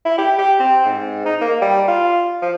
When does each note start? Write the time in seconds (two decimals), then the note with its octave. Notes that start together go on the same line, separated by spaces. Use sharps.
0.05 E4
0.18 G4
0.38 G4
0.60 C4
0.85 G#2
1.26 D#4
1.41 A#3
1.62 G3
1.88 F4
2.42 F3